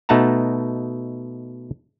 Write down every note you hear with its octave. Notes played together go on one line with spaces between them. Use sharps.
B2 A3 D#4 F#5 A5 A#5